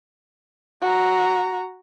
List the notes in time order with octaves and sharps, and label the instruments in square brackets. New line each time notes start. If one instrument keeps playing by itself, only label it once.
[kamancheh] F#4 A#5